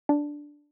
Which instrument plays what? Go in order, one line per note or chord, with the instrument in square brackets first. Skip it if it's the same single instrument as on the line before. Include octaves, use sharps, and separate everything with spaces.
[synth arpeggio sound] D4